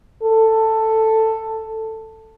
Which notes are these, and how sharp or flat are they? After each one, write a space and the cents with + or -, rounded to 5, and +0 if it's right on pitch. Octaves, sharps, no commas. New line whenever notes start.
A4 +10